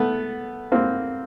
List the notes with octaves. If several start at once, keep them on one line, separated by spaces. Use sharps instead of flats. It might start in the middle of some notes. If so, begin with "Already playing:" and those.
Already playing: A3 B3
A#3 C4